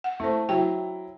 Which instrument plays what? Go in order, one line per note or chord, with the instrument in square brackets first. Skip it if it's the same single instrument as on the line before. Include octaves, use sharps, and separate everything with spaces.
[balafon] F#5
[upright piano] A3 [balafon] E4 C5
[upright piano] F#3 E4 [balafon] G5